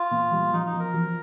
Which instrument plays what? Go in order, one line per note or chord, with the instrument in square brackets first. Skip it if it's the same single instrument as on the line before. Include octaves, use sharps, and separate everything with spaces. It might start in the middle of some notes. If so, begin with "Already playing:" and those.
Already playing: [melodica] F4
[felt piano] A#2
G3
[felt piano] F3 [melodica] D#4
[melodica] D#4
[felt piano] F3
[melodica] A#4
[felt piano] F3